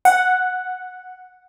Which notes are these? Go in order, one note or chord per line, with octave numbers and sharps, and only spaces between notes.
F#5